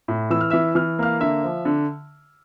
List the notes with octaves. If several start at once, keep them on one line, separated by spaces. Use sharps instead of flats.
A2
E3 E6
F6
E3 E5 E6
E3 F6
A#3 F5 F6
D3 E5 E6
F3
D3